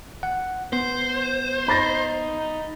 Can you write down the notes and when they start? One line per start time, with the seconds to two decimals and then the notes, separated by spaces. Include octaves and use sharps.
0.23 F#5
0.73 B3 C5
1.68 D#4 B5 A6 A#6